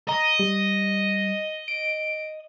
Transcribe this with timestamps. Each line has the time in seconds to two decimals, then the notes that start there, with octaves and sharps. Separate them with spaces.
0.09 D#5 A#5
0.39 G3
1.68 D7